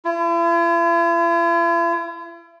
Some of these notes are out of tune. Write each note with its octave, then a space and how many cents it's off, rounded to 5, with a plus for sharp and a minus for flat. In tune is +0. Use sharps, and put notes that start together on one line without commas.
E4 +45